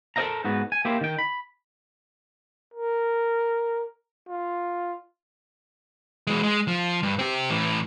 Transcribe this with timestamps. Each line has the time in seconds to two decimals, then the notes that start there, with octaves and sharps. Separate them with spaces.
0.16 A4 A#4 C5 D#5 F5 A#5
0.45 G#2 B3 F#4
0.72 G#5
0.85 A#3 E4 G4 C5
1.01 D#3 G5
1.19 B5
2.74 A#4
4.28 F4
6.27 E3 G#3
6.43 G#3
6.68 F3
7.03 G2
7.19 C4 G4
7.50 A2 E3